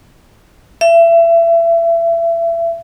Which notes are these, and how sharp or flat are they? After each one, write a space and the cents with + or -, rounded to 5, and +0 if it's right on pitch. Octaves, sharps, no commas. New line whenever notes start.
E5 +30